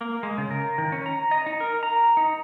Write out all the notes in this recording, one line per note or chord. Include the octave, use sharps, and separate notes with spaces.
A#3
G#3
C#3
A#4
D#3
C#4
A#5
D#5
D#4
A#4
A#5
D#4